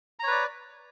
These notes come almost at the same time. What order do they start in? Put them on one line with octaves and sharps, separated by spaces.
A#5 C#5 B4 D5